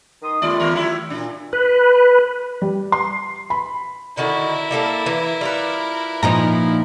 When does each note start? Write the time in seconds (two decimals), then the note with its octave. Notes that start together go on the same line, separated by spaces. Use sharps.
0.22 D#3 C6 D#6
0.42 D#2 G3 A3 F4 D5
0.60 D#2 G3 A#4
0.73 F#3 E4
1.10 A#2 D4
1.53 B4
2.62 G3
2.92 C6
3.50 B5
4.17 D3 D#3 E4 F#4 A#4
4.71 G3 A#3 A4
5.06 E3
5.41 G3 F4 B4
6.23 A#2 F3 D#4 A#5